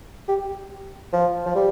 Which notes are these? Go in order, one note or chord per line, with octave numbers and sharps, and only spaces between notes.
G4
F3
F3
G3